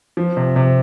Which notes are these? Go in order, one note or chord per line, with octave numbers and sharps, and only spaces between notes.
F3
C3
C3